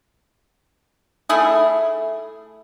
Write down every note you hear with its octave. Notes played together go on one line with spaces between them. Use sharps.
A3 E4 G#4